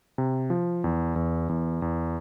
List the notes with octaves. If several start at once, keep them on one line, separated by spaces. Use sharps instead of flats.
C3
F3
E2
E2
E2
E2